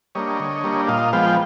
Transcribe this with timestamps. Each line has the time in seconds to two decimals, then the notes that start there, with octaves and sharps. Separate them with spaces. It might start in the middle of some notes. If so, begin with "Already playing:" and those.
0.15 G3 A#3 D4 C#5 D#5
0.40 D3
0.64 G3 A#3 D4
0.88 A#2 D#5 F5
1.13 F3 G#3 B3 F5 G5